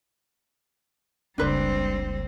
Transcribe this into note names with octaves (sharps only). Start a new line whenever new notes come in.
F#1 C#2 G3 C4 D4 B4 C5